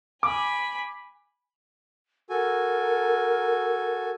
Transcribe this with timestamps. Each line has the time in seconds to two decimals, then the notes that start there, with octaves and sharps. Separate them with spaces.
0.23 G#5 B5 D6
2.30 F#4 A4 A#4 G#5